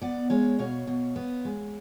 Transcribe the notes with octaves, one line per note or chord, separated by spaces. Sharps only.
B3 D5 F#5
G#3 C#5 F5
B2 C#5 F5
B2
B3
G#3